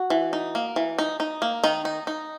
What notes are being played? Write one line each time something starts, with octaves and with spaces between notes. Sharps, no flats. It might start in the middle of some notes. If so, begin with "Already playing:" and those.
Already playing: F#4
E3
D#4
A#3
E3
D#4
D#4
A#3
D#3 D#4
D#4
D#4